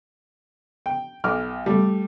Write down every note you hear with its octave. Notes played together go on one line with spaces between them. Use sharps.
G5
B1 D6 F6
G3 A3